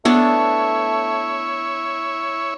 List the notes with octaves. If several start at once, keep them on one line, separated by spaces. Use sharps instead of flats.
A3 B3 D4 E4 C#5